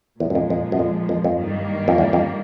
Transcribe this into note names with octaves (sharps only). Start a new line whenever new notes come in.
E2 A#2 F3 G#3
F#2
F2
F2
F#2
F2
F2
F2
G2 D#3 G3 A#3
F2
E2
F2